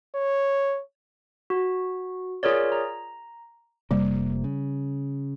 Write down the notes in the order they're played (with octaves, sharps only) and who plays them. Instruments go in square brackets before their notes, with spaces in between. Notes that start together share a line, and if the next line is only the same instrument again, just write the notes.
[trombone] C#5
[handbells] F#4
F4 G#4 A#4 C#5 D5
A#5
[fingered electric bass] F1 C3 A#3 [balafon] G3
[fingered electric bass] C#3